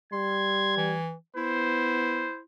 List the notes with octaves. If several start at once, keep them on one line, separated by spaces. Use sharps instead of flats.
G3 C6 G#6
E3
B3 E4 C5